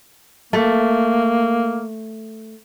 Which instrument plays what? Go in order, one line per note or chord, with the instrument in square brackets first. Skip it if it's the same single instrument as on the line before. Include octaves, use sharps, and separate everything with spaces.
[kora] A3 [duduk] A#3